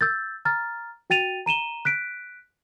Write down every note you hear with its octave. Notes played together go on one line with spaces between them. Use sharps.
E6 G6 A6
A#5 F6 A6
F#4 G5 A6 D#7 F7
A#5 D#7 E7 G7
F#6 B6 D7